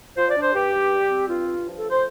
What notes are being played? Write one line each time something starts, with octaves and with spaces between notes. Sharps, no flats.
F3 C5
D5
D4
C5
G2 G4
G2
G3
C4
G2 F4
G2
F3
A4
A3
C5